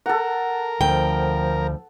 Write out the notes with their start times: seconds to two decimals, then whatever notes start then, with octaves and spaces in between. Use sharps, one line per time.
0.06 A4 A#4 F#5
0.81 D2 F3 G5